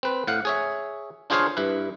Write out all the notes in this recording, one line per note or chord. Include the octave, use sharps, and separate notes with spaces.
C4 B4
A2 F5 F#5
G#4 C#5 E5
D4 F4 G#4 C5 C#5 F5
G2 E4 B4